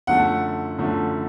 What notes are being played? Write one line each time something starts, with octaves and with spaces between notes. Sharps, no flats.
F#2 D3 F3 A3 F#5
F#2 D3 F3 A3